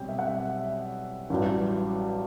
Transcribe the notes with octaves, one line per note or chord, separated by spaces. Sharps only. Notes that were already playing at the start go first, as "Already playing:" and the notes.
Already playing: B1 B2 G3 C4 G5
E5
F#5
E5
A1 G2 F#3